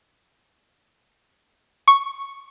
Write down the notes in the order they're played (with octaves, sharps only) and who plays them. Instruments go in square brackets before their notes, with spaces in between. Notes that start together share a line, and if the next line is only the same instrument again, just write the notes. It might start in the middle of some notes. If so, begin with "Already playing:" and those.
[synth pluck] C#6